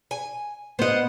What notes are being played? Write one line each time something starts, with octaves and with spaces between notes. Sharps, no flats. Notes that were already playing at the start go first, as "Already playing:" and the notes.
G#5
B3 C5 D#5 F#5